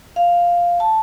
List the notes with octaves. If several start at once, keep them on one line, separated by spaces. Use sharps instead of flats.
F5
A5